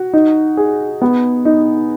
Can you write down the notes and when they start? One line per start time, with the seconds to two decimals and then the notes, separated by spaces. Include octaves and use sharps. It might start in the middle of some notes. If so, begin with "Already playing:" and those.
Already playing: F#4
0.13 D#4
0.57 G#4
1.02 B3
1.45 D#4